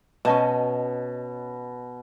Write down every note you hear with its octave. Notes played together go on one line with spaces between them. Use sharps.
B2 C#4 D#5 A5